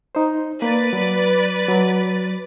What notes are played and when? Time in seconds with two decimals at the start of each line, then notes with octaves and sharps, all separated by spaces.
0.15 D#4 C5
0.62 A#3 B4 D5 A6
0.93 F#3
1.68 F#3